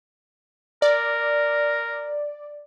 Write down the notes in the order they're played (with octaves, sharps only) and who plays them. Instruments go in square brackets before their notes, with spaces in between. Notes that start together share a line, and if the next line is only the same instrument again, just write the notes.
[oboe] A#4 [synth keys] D5